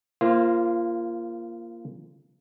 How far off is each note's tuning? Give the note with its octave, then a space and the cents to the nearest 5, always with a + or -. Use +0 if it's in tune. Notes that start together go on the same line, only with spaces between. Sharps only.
A#3 +0 F4 -25 C5 +10